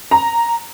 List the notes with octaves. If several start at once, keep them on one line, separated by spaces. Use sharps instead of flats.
A#5